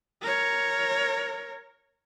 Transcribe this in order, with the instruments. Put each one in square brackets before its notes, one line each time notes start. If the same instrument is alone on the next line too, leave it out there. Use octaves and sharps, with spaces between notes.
[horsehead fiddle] A#4 C#5